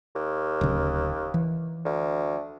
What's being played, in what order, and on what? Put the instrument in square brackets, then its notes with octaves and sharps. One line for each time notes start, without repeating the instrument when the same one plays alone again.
[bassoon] D#2
[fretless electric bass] D1 C#3
E3
[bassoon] D2